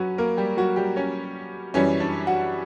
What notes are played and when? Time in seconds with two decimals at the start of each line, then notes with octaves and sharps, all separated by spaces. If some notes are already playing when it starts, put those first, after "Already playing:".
Already playing: F#3 C#4 F#4 B4
0.18 A#3 A#4
0.37 G3 G4
0.57 F#3 F#4
0.76 G3 G4
0.96 C#4 C#5
1.74 F#2 E3 G3 C#4 C#5
2.00 D4 D5
2.27 F#4 F#5